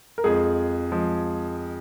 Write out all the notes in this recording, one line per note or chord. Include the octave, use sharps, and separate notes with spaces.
A#4
F2 F3 G#3 G#4
F3 G#3